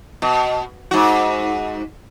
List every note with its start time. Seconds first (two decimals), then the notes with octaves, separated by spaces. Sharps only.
0.22 B2
0.91 G#2 F#4